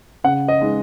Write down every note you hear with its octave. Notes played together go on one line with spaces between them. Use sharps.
C#3 F#5
D#5
G#3 D#4